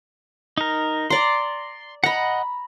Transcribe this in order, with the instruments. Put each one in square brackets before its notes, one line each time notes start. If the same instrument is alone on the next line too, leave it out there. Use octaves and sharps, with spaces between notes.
[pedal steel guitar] D#4 A#4
[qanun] D5 A#5 [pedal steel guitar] C6
[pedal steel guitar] D#5 F#5 [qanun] A#5 B5